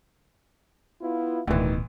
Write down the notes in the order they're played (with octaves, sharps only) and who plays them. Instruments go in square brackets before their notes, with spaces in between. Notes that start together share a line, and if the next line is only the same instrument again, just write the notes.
[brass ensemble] B3 E4 F4
[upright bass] D1 B2 [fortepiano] D2 E3 [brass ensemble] D#3